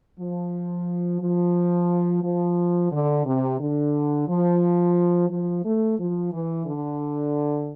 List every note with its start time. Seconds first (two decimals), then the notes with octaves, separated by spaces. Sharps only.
0.19 F3
1.21 F3
2.23 F3
2.92 D3
3.25 C3
3.60 D3
4.28 F3
5.30 F3
5.64 A3
5.98 F3
6.32 E3
6.66 D3